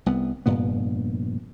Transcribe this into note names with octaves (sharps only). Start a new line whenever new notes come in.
C2 B3
F1 G2 A#2 B3